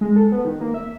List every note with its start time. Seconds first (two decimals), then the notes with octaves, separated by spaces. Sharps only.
0.01 G#3
0.16 A4
0.32 B3
0.45 D#3
0.61 A#3
0.74 E5